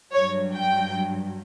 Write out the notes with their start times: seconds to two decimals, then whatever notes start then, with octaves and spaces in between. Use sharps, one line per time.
0.12 G2 F#3 C#5
0.54 G5